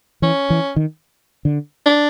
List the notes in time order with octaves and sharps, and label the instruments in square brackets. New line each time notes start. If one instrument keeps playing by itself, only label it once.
[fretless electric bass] E3 [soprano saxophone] C#4
[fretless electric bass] E3
D#3
D3
[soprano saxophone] D4